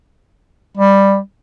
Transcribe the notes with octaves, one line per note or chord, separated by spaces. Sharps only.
G3